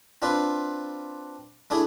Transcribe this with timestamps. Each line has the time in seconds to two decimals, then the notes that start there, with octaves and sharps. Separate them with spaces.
0.22 C4 D4 F4 B4
1.70 A3 D4 E4 G#4